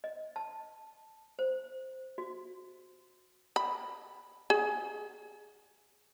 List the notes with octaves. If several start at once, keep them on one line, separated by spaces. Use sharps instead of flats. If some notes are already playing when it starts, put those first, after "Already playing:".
D#5
A5
C5
F#4
B5
G#4